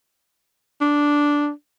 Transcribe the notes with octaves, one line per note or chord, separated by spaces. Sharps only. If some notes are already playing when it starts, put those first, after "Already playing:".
D4